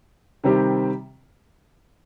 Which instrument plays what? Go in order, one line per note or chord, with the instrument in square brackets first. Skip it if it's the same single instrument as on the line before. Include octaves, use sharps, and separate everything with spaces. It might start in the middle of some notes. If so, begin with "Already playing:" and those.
[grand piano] C3 D#3 G3 C4 G4